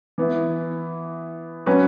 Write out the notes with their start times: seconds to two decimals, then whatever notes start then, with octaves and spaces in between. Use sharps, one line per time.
0.18 E3 B3 E4
1.66 F#3 C#4 F#4 B4